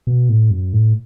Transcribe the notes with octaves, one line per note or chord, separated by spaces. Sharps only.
B2
A2
F#2
A2